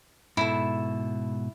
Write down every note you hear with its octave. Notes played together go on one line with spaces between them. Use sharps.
G#2 B2 E4 A4